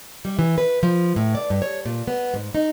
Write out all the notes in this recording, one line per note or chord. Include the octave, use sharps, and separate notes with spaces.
G3
E3
B4
F3
A2
D5
G2
C#5
A#2
B3
G#2
D#4